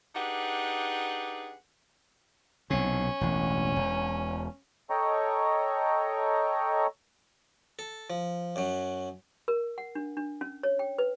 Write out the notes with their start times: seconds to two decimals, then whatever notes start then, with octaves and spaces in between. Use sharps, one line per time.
0.15 D4 D#4 G4 G#4 B4 F#5
2.70 B1 C3 C#4
3.21 E1 A1
3.76 E1
4.90 A4 C#5 D#5 G5 A#5 C#6
7.79 A4
8.10 F3
8.56 F#2 F#3
9.48 A#4
9.78 F#5
9.95 D4
10.17 D4
10.41 C#4
10.63 C#5
10.79 G5
10.98 B4